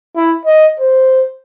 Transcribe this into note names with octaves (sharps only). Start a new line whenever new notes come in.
E4
D#5
C5